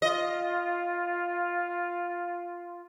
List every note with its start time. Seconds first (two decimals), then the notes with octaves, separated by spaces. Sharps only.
0.02 F4 D#5